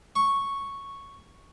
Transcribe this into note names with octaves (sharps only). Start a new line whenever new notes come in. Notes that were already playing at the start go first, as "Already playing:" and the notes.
C#6